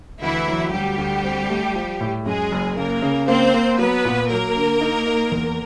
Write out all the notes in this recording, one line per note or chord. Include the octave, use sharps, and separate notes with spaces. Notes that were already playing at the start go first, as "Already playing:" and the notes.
D2 E3 E4
F#3
D2 G3 G4
D2
C4
A3
F3
A2
F#2 G#3 G#4
F#1
C#3 A#3 A#4
C#3
A#3 C4 C5
A#3
F#3 B3 B4
A#2
F#3 A#3 A#4
D3
D#4
D#4
E2